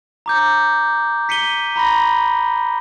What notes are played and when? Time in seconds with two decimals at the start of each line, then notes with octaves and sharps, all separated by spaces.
0.26 A#5 D6 G6
1.29 B6 C#7 D#7 G7
1.76 A#5 B5 C#6 A#6